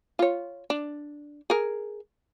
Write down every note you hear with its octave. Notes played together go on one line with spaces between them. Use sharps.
F4 C#5
D4
G#4 A#4